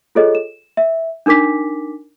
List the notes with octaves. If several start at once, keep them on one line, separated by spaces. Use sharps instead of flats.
F4 G#4 A4 C#5 D#5
E7
E5
D4 D#4 A#4 D6 B6